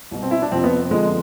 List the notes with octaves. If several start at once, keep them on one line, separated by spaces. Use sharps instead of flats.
C2 B2
C4
E4
D4
F2 C3 F3 C4
B3
F2 D3 F3 G#3